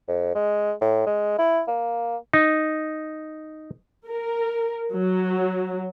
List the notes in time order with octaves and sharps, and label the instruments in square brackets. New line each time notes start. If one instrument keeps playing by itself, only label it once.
[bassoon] F2
G#3
A2
G#3
E4
A#3
[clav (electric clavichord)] D#4
[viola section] A#4
F#3